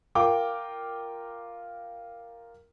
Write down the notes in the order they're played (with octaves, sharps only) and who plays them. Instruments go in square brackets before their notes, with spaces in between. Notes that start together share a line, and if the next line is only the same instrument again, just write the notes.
[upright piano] F4 A#4 G5 D6